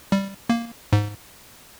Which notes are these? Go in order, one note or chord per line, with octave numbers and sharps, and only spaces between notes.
G3
A#3
G#2